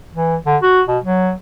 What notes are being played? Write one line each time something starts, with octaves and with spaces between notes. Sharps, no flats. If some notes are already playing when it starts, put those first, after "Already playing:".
E3
D3
F#4
B2
F#3